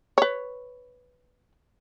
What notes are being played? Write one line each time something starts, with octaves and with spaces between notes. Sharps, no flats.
B4 C#5